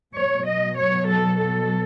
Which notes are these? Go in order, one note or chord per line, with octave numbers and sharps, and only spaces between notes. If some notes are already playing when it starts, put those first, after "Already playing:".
B2 F#3 C#5
D#5
C#5
A4
A4